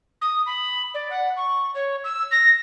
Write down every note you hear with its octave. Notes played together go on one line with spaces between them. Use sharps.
D#6
B5
D5
F#5
C#6
C#5
E6
A#6